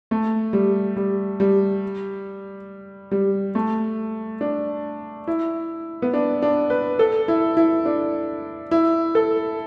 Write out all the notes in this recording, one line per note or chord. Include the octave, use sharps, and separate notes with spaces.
A3
G3
G3
G3
G3
A3
D4
E4
B3
D4
D4
B4
A4
E4
E4
D4
E4
A4